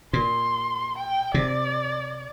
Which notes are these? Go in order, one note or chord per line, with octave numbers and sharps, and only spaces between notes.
A#2 C6
G5
C3 D5